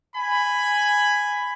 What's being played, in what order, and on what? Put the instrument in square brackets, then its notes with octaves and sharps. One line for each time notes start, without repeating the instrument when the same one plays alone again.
[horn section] G#5 B5